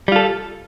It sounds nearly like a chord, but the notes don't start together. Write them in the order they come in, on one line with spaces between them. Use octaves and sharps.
G3 F4 A4